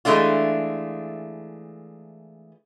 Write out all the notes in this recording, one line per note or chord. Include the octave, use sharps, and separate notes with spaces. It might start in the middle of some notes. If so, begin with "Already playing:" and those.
E3 G#3 A3 D4 F4